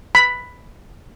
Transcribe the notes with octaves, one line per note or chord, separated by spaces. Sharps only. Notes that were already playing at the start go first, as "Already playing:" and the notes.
B5